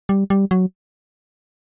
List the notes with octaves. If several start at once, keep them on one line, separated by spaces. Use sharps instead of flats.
G3
G3
F#3